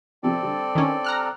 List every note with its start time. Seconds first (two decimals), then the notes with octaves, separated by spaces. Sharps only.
0.23 C3 F3 C4 G4 A4 D5
0.42 D3 G3
0.75 D#3 C#4
1.04 A#5 F6 F#6